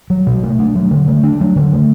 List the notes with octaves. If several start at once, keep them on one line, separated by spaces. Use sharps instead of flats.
F#3
B2
A3
D4
F#3
D3
A3
D4
F#3
D3
A3